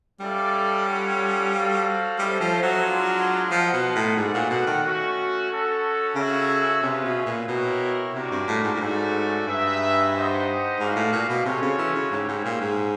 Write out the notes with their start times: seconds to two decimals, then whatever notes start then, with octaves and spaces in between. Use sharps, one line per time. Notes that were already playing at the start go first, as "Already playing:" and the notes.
0.20 G3 C#4 E4 A4 D5 F5
0.86 C#4 F4 A4 C#5 F#5
1.52 F#4 A4 C5 F5
2.18 G3 C#4 E4 A4 C5 D#5
2.41 F3
2.63 F#3
2.85 G#3 B3 D4 F4
3.50 F3 F4 A#4 D#5 F#5
3.73 B2
3.95 A2
4.17 G#2 F#4 A4 D5 F#5
4.34 A#2
4.50 B2
4.67 D#3
4.84 A3 C#4 F#4
5.50 C#4 F#4 A4
6.15 C#3 F#4 A4 C#5 E5
6.81 C3 C#4 F4 G#4 B4 E5
7.04 B2
7.26 A#2
7.48 B2 E4 G4 A#4 C#5
8.14 C3 D4 F#4 A#4
8.31 G2
8.47 A2
8.64 G#2
8.75 A2
8.81 G#2 A3 C#4 F#4 A4 D5
9.46 G2 D#4 G#4 B4 E5
10.13 D#4 G4 C5 D#5 F#5
10.79 G#2 F#4 B4 D5 F5
10.96 A2
11.13 A#2
11.29 B2
11.45 C3 G#3 C#4 F#4 A4 C#5
11.62 C#3
11.78 E3
11.95 C#3
12.11 G#2 C#4 E4 G4
12.28 G#2
12.45 A#2
12.61 G#2